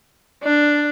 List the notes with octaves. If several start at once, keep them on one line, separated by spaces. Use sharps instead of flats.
D4